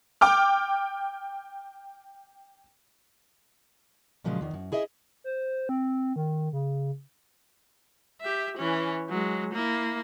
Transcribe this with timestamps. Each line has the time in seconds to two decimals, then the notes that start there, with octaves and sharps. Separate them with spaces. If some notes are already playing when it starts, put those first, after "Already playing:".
0.21 G5 D6 F6
4.24 A#2 C#3 F3 F#3 G#3
4.41 E2 D#3
4.54 F#2
4.72 E4 G#4 D#5 E5
5.24 C5
5.69 C4
6.16 D#3
6.53 C#3
8.21 G4 E5
8.58 E3 C#4
9.10 F#3 G#3
9.54 A#3 E4